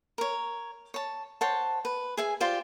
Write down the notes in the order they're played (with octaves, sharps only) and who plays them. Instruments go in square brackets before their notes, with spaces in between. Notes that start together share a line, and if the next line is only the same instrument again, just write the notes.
[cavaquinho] A#4 C#5
C#5 A5
C5 C#5 F#5 A5
B4
G#4 E5 G#5
F4 G4 C5 D5